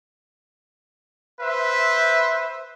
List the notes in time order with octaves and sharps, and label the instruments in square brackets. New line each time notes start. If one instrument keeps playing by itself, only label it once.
[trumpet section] B4 C5 E5